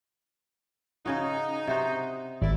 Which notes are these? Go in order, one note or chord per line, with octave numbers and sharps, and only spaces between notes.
C#3 C#4 D#4 F#4
C3 F#4 C5
G#1 E4 D5